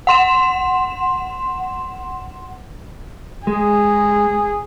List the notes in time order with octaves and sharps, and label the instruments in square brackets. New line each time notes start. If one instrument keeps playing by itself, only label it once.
[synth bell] F#5 C6 E7
[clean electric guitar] G#3 [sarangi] G#4